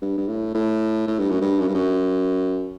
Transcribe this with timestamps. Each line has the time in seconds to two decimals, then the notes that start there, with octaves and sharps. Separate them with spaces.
0.02 G2
0.18 G2
0.28 A2
0.55 A2
1.08 A2
1.19 G2
1.30 F#2
1.41 G2
1.60 F#2
1.68 G2
1.75 F#2